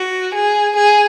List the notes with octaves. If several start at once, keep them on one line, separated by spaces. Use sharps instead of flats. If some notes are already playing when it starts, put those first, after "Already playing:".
Already playing: F#4
G#4
G#4